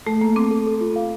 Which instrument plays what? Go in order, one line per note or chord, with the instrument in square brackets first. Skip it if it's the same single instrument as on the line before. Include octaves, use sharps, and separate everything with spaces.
[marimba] A3 [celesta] A4
[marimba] A#3 [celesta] A4
[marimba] C4 [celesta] D6
[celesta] A4
A4
F4
F5